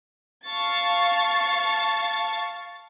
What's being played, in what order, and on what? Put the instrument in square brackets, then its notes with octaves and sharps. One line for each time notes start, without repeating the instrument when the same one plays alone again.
[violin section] F5 A5 C#6 A6